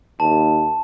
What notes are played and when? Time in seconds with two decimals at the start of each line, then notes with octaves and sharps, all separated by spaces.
0.20 D#2 A5